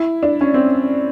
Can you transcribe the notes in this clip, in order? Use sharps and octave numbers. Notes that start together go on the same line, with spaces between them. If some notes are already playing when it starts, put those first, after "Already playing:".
Already playing: E4
D4
C#4
C4